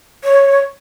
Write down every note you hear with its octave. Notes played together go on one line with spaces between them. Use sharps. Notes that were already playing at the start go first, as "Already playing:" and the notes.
C#5